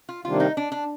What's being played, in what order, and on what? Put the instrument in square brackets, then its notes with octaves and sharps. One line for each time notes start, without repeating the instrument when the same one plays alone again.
[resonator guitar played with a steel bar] F4
[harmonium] C3 D#3 G3 A#3 D4 [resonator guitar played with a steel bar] F4
[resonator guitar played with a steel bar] D#4
D4
D4